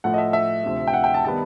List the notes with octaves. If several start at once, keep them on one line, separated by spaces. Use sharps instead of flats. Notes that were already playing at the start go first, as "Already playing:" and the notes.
A2 F3 A3 F#5
D#5
E5
E5
D2 C3 F3
G5
F#5
G5
A5
D#3 G3 B3 A5